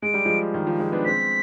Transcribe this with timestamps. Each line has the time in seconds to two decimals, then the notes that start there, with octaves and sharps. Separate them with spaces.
0.02 G#3 D7
0.14 G3
0.25 F3 G#3
0.54 D#3
0.67 F3
0.79 F3 G#3
0.92 B3 D4
1.05 G#3 C4 B6